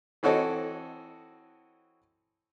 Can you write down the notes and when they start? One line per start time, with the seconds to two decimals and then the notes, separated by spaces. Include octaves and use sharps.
0.23 E3 C4 F#4 A4 C#5 D#5